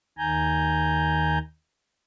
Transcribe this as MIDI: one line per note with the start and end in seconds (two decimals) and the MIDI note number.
0.18 1.38 39
0.18 1.38 51
0.18 1.38 80
0.18 1.38 82
0.18 1.38 91